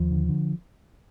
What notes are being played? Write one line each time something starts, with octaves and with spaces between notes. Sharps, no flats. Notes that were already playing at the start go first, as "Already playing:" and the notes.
Already playing: D#2 F3
D3
D3